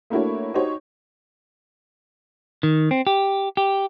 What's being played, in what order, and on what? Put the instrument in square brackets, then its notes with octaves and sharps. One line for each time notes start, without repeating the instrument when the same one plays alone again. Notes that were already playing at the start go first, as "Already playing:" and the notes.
[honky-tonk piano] A3 A#3 D4 E4 F#4 C#5
D#4 F#4 G4 C5 C#5
[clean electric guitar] D#3
C4
G4
G4